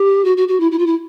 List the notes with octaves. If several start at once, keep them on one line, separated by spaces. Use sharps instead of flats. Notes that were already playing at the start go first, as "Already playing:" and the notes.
Already playing: G4
F#4
F#4
F#4
E4
E4
F4
E4